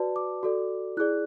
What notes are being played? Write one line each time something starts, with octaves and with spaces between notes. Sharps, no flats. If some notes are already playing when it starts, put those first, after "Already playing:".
Already playing: F#4 B4 D5 A5
D6
F#4 A4 D5
E4 G#4 D5 F#6